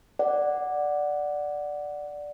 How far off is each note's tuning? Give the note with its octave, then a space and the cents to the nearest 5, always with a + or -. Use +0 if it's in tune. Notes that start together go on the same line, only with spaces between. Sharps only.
D5 +0 F#5 +0